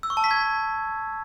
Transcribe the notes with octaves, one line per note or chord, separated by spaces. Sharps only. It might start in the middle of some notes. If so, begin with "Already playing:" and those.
E6
C#6
A5
B6
G#6